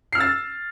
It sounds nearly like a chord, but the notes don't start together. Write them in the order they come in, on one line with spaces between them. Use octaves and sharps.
C7 F6 E6 A6